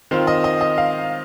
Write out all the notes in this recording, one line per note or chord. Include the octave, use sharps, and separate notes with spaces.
D#3 C4 F4 C5
D#5
D#5
D#5
F5